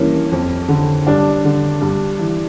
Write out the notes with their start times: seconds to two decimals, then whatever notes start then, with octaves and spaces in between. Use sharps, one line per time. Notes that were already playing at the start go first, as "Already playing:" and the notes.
Already playing: G2 E3 A#3 C#4
0.32 F2
0.68 D3
1.07 G2 D4
1.45 D3
1.81 G2
2.19 E3